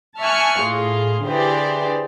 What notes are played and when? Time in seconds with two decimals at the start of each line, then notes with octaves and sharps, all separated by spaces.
0.21 E5 G#5 A5 C#6 F6 F#6
0.61 A2 F4 G#4
1.25 D3 E3 G4 G#4 C5 D5